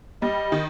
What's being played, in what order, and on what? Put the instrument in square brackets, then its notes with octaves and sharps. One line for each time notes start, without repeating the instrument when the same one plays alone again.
[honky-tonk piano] G3 [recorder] D#5
[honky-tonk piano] D#3